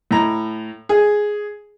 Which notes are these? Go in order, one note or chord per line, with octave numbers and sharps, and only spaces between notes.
A2 A#5
G#4